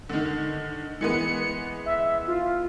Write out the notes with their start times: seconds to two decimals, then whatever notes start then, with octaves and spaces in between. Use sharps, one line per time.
0.09 D3 D#3
1.01 E3 G#3 B3 C#7
1.86 E5
2.28 F4